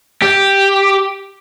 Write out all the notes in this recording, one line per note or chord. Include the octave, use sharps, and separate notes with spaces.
G4